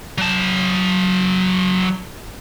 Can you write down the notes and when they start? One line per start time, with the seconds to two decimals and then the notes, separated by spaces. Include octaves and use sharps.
0.18 F#3 A5